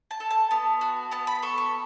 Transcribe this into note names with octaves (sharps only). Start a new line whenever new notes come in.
A5
A4
A5
B3 A5
F#4
B3 A5
B5
A4 C#6
C#6